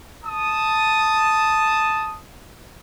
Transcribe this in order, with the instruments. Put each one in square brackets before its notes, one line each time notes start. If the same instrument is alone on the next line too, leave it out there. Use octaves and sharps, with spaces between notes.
[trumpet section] A5 D#6